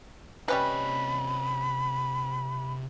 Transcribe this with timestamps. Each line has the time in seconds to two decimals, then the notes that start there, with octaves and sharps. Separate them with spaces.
0.48 C3 G3 C#4 B4 D#5 B5